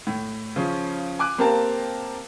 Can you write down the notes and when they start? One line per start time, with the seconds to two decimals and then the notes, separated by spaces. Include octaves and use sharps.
0.07 A2
0.56 C#3 F3 C#4
1.19 G#5 D6 F#6
1.38 A#3 C4 G4 A#4 F5 A5